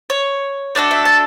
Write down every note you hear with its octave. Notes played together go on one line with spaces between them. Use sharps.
C#5
A3 D4 F#4 A4 D5
E5
A5